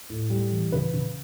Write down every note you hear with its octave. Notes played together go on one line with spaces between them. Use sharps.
A2
G3
E3
C#3 B4
C#3